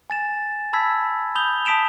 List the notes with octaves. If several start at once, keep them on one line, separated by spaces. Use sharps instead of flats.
G#5 A6 E7
A5 B5 E6 G#6 B6
B5 D#6 G6 F7 G7
A5 D#6 B6 D7 E7 F7